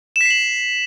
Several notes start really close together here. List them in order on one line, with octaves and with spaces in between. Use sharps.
E7 B6 C7 F#7